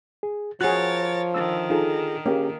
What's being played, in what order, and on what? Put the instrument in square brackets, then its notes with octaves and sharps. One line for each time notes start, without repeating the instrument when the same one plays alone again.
[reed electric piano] G#4
[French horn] F3 [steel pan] F#4 G#4 [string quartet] A#4 C#5 A6 [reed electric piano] F#6
[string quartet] D3 D#3 [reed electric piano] E6
[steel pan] D#4 [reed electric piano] F4 G#4 A4
[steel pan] A#3 [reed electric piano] C#4 G4 G#4